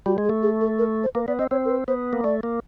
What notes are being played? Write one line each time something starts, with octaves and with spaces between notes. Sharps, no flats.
G3 F#4
G#3
G#4
A3
G#4
A4
A#4
C5
A#3 B4
B3 D5
C4 D#5
C4 C#5
A#4
B4
B3 C5
A#3
A3 D5
A#3